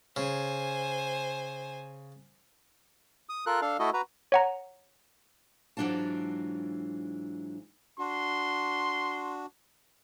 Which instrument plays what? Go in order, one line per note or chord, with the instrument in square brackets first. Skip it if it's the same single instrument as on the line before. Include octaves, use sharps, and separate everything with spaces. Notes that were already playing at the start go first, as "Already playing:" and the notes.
[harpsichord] C#3 [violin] C5 G#5
[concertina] D#6
F4 A4 A#4 F#6
D4 A4 F5
A3 E4 F#4 A4 D#5
F#4 B4 A#5
[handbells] C#5 F#5 A#5
[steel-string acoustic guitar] G#2 E3 F#3 D4 F4 A5
[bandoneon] D4 F#4 [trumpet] C6